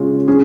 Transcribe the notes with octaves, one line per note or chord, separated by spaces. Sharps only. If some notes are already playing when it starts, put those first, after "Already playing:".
Already playing: C#3 G#3 C#4 F4
C#4 G#4